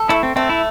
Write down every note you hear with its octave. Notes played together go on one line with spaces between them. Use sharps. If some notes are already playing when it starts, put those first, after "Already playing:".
Already playing: A4
A3 E4
C4
A3 C4
E4